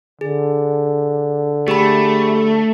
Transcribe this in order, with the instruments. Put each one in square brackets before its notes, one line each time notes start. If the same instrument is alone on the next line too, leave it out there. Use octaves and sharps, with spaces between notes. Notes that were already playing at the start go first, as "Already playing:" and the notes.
[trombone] D3 [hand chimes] G#4
[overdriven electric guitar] A3 [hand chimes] G4 G#4 B5